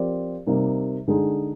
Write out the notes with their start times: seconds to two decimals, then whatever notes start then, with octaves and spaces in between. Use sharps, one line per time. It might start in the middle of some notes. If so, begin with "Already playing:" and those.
Already playing: F3 C4 G4 A#4 D5
0.47 C3 G3 A#3 D#4
1.08 D3 G#3 D#4 G#4